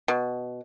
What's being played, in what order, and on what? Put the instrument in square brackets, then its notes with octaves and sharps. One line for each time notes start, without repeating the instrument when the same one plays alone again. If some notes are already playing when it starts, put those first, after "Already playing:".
[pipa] B2